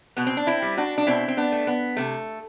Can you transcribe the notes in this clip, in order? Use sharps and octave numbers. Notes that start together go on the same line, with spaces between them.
B2 B3
C4
D4
C4 E4
G3
D4 F#4
D4
B2 C4 E4
C4
B3 D4
A3
B3
C3 A3